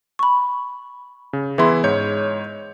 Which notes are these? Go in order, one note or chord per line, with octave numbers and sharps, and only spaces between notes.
B5 C#6
C#3
E3 B3 E4 G#4 C6
G#2 C#5 G6